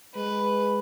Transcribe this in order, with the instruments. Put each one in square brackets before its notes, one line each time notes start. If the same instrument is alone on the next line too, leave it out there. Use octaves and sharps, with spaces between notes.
[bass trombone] G#3 [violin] B4